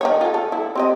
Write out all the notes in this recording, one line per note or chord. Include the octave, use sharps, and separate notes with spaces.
D#3 D#4 C#5
F4 A4
A4
E4
C4 G4 D#5